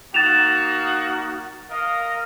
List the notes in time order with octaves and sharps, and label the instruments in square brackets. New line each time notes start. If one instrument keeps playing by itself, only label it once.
[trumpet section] A#3 D#4 F#4 [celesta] A6 E7 F7
[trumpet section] A#4 D#5 F5